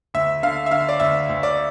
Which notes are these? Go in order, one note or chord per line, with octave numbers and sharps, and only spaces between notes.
D2 E5
D3 F5
E5
D3 F5
D5
D2 E5
D2
D5